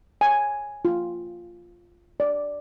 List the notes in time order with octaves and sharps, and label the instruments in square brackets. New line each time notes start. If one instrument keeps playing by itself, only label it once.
[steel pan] G#5
F4
D5